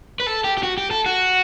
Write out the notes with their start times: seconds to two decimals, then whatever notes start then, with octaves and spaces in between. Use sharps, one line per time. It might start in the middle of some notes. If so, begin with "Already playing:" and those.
0.20 B4
0.27 A4
0.44 G4
0.57 G4
0.63 F#4
0.78 G4
0.91 A4
1.06 F#4